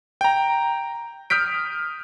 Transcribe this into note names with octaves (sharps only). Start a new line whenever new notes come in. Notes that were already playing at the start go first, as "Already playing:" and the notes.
G5 A#5
D#6 F6 G6 B6 D7